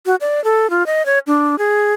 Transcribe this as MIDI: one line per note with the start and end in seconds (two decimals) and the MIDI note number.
0.06 0.16 66
0.21 0.43 74
0.44 0.70 69
0.70 0.86 65
0.86 1.05 75
1.06 1.19 73
1.27 1.58 62
1.58 1.93 68